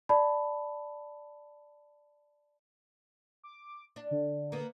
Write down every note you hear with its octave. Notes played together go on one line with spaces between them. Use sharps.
D5 A5 B5
D6
D4
D3
A#3 B3